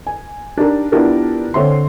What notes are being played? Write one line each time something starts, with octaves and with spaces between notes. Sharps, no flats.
G#5
D4 D#4 G4 A#4
B3 D4 E4 F4 G4 A#4
D3 C4 C#5 E5 C6